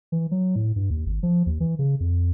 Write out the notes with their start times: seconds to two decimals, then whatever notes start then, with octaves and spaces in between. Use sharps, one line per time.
0.12 E3
0.31 F#3
0.56 A2
0.76 G2
0.90 D#2
1.06 G#1
1.23 F3
1.46 D#2
1.60 E3
1.79 C#3
2.00 F2